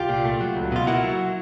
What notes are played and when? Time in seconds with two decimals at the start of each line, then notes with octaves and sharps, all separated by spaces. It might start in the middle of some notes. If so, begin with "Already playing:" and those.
Already playing: C2 F4 G4
0.09 A#2
0.25 A3
0.41 F#3
0.56 C#2
0.72 B2 F4
0.87 A#3 E4 F#4
1.03 F#3